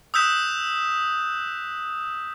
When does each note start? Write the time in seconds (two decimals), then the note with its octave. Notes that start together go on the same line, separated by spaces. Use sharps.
0.14 D#6 E6 F#6 G6 B6 E7